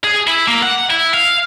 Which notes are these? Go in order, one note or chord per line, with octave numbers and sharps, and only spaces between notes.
G#4
E4
A#3
F#5
E4
F5